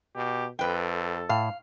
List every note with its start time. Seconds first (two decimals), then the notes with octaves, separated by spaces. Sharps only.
0.15 B2 G4
0.59 F2 A4 B4 G5
1.29 A2 F5